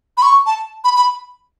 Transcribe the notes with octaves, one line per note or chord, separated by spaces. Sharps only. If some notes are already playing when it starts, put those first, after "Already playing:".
B5
C#6
A5
B5
B5